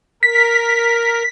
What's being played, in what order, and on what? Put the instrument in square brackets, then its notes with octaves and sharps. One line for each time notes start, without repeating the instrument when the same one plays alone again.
[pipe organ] A#4 [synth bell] B6